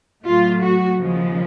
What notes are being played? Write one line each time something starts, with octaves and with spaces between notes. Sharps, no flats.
A2 F#3 A3 F4
F#4
D#2 C#3 F3 G#3